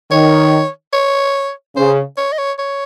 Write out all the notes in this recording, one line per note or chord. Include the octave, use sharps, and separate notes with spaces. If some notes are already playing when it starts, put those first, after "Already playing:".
D#3 C#5
C#5
C#3 C5
C#5
D#5
C#5
C#5